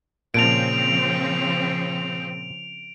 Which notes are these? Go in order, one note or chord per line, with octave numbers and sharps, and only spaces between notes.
A#2 C#3 F3 C4 A5 D7 F7